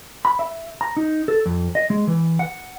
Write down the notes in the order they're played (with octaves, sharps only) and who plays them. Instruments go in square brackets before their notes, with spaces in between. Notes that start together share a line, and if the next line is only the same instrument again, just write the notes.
[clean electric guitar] B5
E5
A#5
D#4
A4
F2
D#5
G#3
E3
F#5